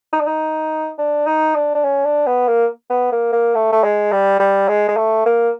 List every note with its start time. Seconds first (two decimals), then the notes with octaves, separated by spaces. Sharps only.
0.13 D#4
0.20 D4
0.27 D#4
0.98 D4
1.27 D#4
1.55 D4
1.75 D4
1.84 C#4
2.05 D4
2.27 B3
2.48 A#3
2.90 B3
3.12 A#3
3.33 A#3
3.55 A3
3.73 A3
3.84 G#3
4.12 G3
4.40 G3
4.68 G#3
4.89 G#3
4.97 A3
5.26 A#3